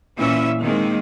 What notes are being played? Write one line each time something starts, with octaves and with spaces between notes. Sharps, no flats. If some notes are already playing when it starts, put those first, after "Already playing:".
A#2 E3 C#4 E5
D#3 G#3 A#3 C4